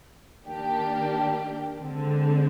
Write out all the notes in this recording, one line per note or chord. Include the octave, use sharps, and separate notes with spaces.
D#3 A#3 D4 G4
D3 G#3 C4